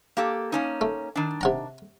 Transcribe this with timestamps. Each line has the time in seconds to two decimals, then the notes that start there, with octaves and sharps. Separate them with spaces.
0.17 A#3 G4 A4
0.52 A#3 C#4 D#4
0.81 A3
1.16 D#3 D4
1.41 C3 F#5 A#5